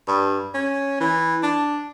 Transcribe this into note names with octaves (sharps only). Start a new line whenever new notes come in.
G2
C#4
E3
D4